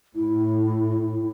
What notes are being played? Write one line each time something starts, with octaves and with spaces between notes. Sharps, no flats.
A2 E4